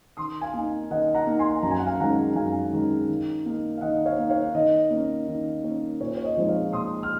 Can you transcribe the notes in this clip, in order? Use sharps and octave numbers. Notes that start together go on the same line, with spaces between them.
D#3 C6 D#6
F5 G#5
A#3 D#4
D#3 D#5 F#5
F#5 A#5
A#3 D#4
G#5 C6
F#2 A#5
G#5
F#5
F5 G#5
D#3 G#3 C#4 F#5 A#5
F#2 F5 G#5
D#3 G#3 C#4
D#3
A#3 D#4
F5
D#3 D#5 F#5
C#5 F5
A#3 D#4
C#5 F5
D#3 D#5
A#3 C#4
D#3
A#3 C#4
A#2 C#5
C#5
D#5
F3 G#3 C4 D#4
C#5 F5
A#2 C6 D#6
F6